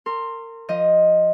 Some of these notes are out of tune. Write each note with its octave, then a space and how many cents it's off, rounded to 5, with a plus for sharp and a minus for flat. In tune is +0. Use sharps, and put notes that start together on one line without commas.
A#4 -30 C6 +10
F3 +0 D#5 +0